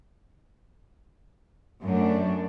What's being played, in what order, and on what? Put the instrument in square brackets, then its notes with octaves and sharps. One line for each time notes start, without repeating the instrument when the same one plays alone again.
[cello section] F#2 A3 D4